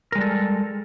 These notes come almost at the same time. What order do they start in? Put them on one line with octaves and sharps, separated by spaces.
A#4 G#3 G3 A4